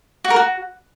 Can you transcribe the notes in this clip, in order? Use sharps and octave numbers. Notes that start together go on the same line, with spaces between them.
F#4
A#4
F#4